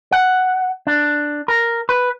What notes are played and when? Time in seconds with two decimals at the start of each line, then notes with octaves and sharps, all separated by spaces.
0.12 F#5
0.87 D4
1.48 A#4
1.89 B4